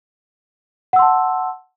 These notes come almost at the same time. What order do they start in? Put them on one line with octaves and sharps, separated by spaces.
F#5 E6 C6 A5